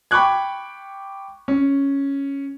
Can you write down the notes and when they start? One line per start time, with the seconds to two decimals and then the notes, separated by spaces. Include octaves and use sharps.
0.11 G5 B5 C#6 D6 F#6 G#6
1.48 C#4